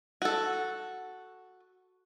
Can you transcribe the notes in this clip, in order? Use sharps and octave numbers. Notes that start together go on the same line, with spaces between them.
F#4 A4